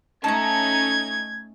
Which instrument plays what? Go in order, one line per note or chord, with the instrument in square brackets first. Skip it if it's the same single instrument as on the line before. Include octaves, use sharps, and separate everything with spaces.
[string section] A3 C#4 D#4 [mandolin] A5 A#5 [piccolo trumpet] G#6